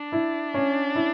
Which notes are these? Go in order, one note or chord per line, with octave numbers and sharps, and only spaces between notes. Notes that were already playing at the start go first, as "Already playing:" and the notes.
Already playing: D4
E4
C#4
E4